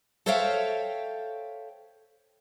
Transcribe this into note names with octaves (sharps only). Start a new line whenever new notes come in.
A4 C5 C#5 E5 F5 G5